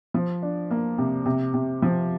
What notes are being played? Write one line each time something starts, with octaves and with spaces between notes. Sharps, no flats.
F3
D4
A#3
C3
C3
C3
F3